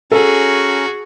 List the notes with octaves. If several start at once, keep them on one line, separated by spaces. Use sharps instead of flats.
C#4 F#4 G#4 A4 A#5